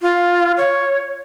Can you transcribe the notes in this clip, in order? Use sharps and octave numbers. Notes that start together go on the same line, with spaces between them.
F4
C#5